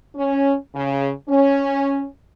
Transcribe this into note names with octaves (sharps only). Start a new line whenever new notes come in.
C#4
C#3
C#4